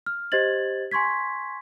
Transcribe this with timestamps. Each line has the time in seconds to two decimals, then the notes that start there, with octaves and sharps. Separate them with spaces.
0.06 F6
0.32 G4 C5 D#5 G#6 A6 F#7
0.91 G#5 C6 C#6 G#6 B6